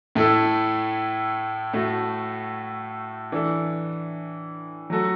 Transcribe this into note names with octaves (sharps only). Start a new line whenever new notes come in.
A2 A3 E4 A4
A2 A3 F#4
E3 D4 A4
F#3 A3 F#4 A4